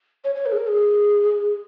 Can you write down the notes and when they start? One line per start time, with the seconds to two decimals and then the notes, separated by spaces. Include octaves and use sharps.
0.24 C#5
0.35 C#5
0.46 A#4
0.52 G#4
0.57 A#4
0.67 G#4